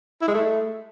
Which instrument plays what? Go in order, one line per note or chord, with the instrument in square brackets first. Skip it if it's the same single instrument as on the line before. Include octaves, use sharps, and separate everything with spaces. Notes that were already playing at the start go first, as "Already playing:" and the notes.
[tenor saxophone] E4
G#3
A3